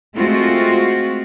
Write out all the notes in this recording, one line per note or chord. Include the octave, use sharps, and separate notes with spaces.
G#3 A3 C4 F4 F#4